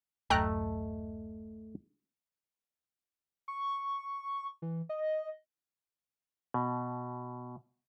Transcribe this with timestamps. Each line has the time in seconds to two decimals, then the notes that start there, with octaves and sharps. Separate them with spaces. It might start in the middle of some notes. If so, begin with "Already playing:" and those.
0.30 D1 F#2 A3 D#5 G5 A#5 F#6
3.48 C#6
4.62 E3
4.89 D#5
6.54 B2